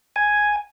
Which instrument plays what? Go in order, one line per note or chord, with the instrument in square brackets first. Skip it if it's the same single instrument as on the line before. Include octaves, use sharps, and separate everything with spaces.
[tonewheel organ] G#5